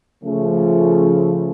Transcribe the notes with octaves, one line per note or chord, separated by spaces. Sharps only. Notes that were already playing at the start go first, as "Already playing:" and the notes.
C#3 F3 A3